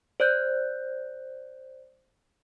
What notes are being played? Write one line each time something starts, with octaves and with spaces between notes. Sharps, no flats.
C5 D5 F#6 G6